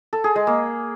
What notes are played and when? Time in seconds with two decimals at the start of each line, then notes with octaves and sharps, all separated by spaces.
0.13 A4
0.24 G#4
0.36 G#3
0.47 A#3